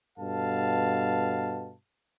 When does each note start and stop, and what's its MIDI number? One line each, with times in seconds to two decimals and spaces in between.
0.18 1.73 43
0.18 1.73 47
0.18 1.73 69
0.18 1.73 77
0.18 1.73 81